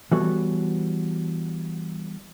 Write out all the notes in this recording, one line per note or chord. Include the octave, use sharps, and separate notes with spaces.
E3 G3 B3 F#4 A4 C#5